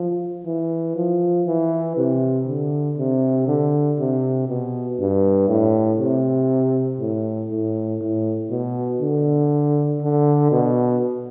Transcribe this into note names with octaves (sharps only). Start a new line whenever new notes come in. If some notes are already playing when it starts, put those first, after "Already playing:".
Already playing: F3
E3
F3
E3
C3
D3
C3
D3
C3
B2
G2
A2
C3
A2
A2
A2
B2
D3
D3
B2